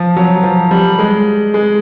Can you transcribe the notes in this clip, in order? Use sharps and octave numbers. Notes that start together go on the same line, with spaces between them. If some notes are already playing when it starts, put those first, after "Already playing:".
Already playing: F3
F#3
F3
G3
G#3
G#3